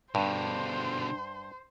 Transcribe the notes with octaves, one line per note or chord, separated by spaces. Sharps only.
G2 B2 D3 C5